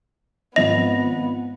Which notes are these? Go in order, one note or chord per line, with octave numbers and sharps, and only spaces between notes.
G#1 F3 B3 D#5 A#6 F7